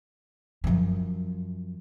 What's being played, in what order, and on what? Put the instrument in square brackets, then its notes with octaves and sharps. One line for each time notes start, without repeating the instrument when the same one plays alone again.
[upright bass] F#2 F3